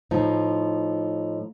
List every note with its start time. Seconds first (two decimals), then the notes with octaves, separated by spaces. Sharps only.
0.11 A2 F3 D#4